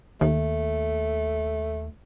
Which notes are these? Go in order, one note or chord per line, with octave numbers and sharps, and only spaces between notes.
D#2 A3